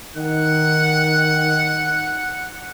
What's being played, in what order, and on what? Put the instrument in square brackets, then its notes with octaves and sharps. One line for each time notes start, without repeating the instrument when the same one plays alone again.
[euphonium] D#3 [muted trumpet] F#5